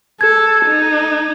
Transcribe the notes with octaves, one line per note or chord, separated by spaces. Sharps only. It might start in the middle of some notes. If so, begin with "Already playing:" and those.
A4 G#6
D#4